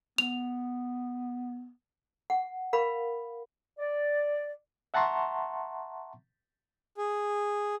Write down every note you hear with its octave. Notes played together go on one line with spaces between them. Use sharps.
B3 F7
F#5
A#4 F5 B5
D5
E5 F#5 A5 A#5 C6 C#6
G#4